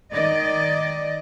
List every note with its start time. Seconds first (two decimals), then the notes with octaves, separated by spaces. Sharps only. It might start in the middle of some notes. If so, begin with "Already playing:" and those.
0.13 D#3 D5 D#5